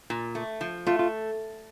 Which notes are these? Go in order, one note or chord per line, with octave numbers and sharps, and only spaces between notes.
A#2
A3
F3
A3 F4
F4